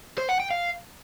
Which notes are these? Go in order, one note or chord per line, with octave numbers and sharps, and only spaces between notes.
C5
F#5
G5
F5